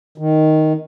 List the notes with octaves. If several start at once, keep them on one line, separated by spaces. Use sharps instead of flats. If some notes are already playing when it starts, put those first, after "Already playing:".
D#3